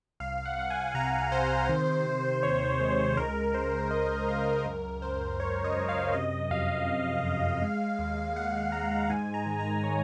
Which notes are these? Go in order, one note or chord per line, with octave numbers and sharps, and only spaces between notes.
C2 F5
F#5
C2 F#5
G#5
C3 A#5
C3 C5
D#3
D#3
D#2 C#5
G#3
C#2 A#4
C#3 C5
G#3 D#5
C#2 F5
F#2 A#4
F#2 C5
F#2 C#5
D#5
F#2
F5
C3 D#5
F2 F5
F2
F2
G#3
D#2
D#2 F#5
G#3 A#5
G#2 G#5
A#5
D#3
A#5
D#3 C#5